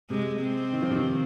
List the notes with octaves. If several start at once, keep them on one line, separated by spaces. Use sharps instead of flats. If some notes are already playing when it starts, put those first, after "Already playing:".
C3 G#3
C4
D#3
F3
C3 D#3